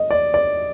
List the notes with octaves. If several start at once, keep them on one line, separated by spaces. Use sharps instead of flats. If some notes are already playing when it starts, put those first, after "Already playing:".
Already playing: D#5
D5
D5